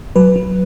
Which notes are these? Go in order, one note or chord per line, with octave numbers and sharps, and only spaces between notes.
F#3 B4
F#3